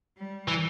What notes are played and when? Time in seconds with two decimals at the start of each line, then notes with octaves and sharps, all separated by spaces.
0.17 G3
0.48 E3